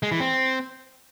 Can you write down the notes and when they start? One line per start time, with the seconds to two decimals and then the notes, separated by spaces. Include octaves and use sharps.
0.03 G#3
0.11 E3
0.20 C4